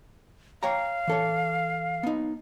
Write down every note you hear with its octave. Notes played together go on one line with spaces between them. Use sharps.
C#5 F5 G5 A#5
E3 A4 C#5
B3 D#4